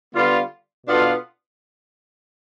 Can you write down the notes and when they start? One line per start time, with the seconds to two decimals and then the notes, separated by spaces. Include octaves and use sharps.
0.14 D3 G3 B3 F4
0.86 B2 B3 D4 F4 A4